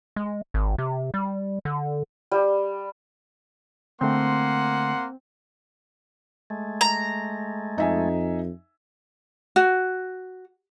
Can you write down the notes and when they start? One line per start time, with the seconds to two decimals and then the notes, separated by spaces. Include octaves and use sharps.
0.16 G#3
0.54 G#1
0.78 C3
1.14 G3
1.65 D3
2.31 G3
4.01 D3 A3 A#3 C4 F#5 C6
6.50 G#3 A3
6.81 A#5
7.78 F2 D#4 E5 G#5
9.56 F#4